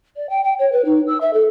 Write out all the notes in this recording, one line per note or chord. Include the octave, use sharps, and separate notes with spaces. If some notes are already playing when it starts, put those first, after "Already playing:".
D5
G5
G5
C#5
B4
D#4
E6
E5
A4